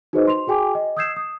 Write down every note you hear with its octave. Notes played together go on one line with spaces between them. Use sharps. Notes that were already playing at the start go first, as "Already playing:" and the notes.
D#4 F#4 G#4 B4 C5 D#5
C6 F7
F#4 G#4 G5 G#5 D6
D#5
D#6 E6 G6 G#6 C7 E7
D#6